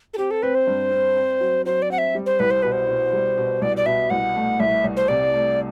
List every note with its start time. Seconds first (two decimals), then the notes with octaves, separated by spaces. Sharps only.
0.14 A4
0.18 C4 G4
0.31 A4
0.43 C4 B4
0.55 C5
0.67 G2
0.91 C4
1.17 C4
1.40 F#3
1.66 F#3 C5
1.82 D5
1.90 C4 F#5
1.98 E5
2.15 G3
2.26 C5
2.40 C2 B4
2.51 C5
2.62 B2 B4
2.72 C5
2.89 B2
3.13 G3
3.37 B2
3.61 C2 D5
3.77 D5
3.86 B2 E5
4.10 C2 F#5
4.36 A3
4.60 C2 E5
4.84 C2
4.97 C5
5.08 C3 D5
5.34 A3